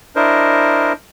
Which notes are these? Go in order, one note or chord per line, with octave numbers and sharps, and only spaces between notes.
D4 E4 A#4 C5 D#5